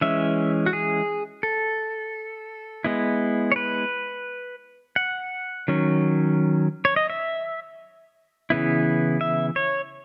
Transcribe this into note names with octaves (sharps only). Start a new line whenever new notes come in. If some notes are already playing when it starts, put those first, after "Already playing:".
E3 G#3 C#4 E5
F#4
G#4
A4
G#3 B3 E4
C#5
B4
F#5
D#3 F#3 C#4
C#5
D#5
E5
C#3 E3 B3 E4
E5
C#5